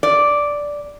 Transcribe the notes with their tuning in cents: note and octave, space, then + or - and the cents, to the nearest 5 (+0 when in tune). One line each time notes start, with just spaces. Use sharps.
D5 -5